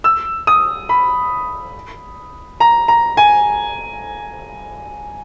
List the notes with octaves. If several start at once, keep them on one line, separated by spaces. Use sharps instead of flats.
E6
D#6
B5
A#5
A#5
G#5